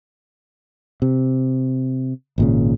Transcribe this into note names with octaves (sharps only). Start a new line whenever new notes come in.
C3
G#1 A#2 C#3